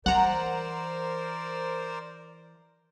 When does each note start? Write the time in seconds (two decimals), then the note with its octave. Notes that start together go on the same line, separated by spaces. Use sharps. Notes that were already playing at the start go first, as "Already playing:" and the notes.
0.06 E3 A#4 C5 D5 F#5 A#5